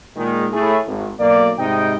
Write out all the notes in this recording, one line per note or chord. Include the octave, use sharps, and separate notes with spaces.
A#2 D#3 G#3
A2 A3 E4 G#4
G#1
B1 A#3 D5
G#2 C3 G3 D#4 D#5 G5